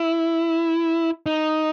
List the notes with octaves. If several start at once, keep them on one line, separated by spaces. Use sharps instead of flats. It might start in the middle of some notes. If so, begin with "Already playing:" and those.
Already playing: E4
D#4